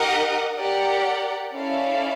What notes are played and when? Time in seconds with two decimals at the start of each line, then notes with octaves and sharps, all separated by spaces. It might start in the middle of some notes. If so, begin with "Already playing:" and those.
Already playing: D#4 G4 A#4 D#5 F#5
0.56 G4 A#4 D5 F#5
1.53 C#4 E4 A4 D5 F5